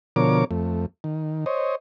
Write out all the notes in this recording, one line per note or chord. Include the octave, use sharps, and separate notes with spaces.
B2 D3 F3 A#4 C#5 D6
F2 A3
D#3
C5 C#5 D#5